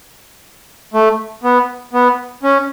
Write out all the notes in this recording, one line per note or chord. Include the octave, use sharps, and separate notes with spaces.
A3
B3
B3
C#4